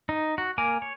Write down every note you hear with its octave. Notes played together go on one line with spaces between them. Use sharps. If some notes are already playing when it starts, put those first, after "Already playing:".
D#4
F#4
A#3 A#4 G#5 D6
C#5